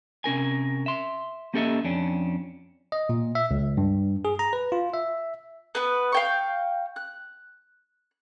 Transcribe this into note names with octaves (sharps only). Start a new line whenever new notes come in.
C3 C#4 A#4 G#5
E5 C6
A#3 C#4 G4 A4 D#5 E5
F2 C#4 D4
D#5
A#2
E5
C#2
G2
G#4
A#5
B4
F4
E5
B3 B4
F5 G5 C#6
F#6